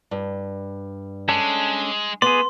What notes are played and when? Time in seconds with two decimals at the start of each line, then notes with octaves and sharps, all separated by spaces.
0.11 G2
1.29 G#3 C#4 D4 A4
2.22 B3 G#4 D5 C6